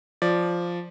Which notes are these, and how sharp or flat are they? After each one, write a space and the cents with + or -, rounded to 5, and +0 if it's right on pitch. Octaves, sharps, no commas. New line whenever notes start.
F3 +0 D5 +0